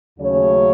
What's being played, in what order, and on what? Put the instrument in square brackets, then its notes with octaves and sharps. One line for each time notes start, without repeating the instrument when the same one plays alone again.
[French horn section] D#2 C#3 F#3 A3 C#4 C#5